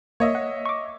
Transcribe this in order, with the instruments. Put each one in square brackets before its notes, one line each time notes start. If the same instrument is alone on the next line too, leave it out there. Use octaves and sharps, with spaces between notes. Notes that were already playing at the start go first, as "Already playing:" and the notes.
[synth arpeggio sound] A#3 [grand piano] C#5 D#5 E5
[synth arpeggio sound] F#5
C#6 D6